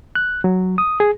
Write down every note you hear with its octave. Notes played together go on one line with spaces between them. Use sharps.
F#6
F#3
D#6
G#4